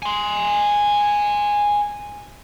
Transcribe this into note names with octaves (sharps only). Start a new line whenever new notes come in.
G#5 C6